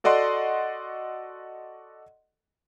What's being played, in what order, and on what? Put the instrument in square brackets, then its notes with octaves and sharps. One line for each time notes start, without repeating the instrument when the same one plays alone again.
[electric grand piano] F#4 A4 D5 D#5 F#5 C6